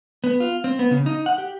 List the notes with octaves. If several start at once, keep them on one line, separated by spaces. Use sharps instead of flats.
B3
F4
C4
B3
C#3
D#4
F#5
G4